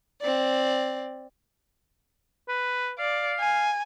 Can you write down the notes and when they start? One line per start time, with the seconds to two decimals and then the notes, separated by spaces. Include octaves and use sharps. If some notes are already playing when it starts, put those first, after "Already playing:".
0.21 C4 D5
2.49 B4
2.99 D5 F5
3.40 G#5